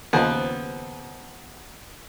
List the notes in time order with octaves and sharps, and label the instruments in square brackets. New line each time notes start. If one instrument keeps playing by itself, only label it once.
[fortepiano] D#2 [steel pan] C#3 F3 G#4 [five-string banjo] B3 C4